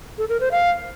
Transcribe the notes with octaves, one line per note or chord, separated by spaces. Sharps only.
A4
A#4
C5
F5